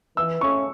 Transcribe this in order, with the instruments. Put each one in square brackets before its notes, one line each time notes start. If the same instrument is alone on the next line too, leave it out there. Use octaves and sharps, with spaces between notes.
[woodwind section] E3 [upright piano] E6
[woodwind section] A3 C#4 [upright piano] C#6